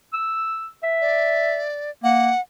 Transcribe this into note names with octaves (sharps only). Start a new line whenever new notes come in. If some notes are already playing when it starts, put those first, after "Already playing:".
E6
E5
D5
A#3 F#5